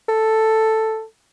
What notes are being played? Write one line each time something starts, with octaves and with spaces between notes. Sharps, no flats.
A4